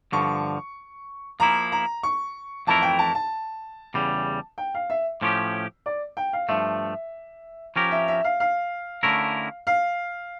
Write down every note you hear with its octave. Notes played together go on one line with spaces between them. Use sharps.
G2 D3 F3 C#6
F3 A#3 E4 A#5
A#5
C#6
F2 E3 A3 E4 A#4 A5
G5
A5
A5
E2 C#3 G3
G5
F5
E5
A2 F3 C#4 G4
D5
G5
F5
G2 F3 A3 E5
F3 C#4 G4 A#4
E5
E5
F5
F5
D3 A3 C#4 E4 A#4
F5